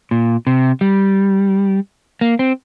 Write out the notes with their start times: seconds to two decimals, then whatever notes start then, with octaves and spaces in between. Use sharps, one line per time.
0.11 A#2
0.47 C3
0.81 G3
2.21 A#3
2.39 C4